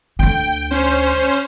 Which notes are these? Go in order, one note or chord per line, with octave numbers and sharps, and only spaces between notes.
D2 D3 G5
C#4 C5